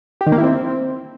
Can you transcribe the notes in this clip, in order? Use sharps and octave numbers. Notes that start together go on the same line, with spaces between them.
G4
D#3
A#3
E4
C4